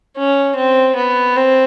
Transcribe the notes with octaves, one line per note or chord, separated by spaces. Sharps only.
C#4
C4
B3
C4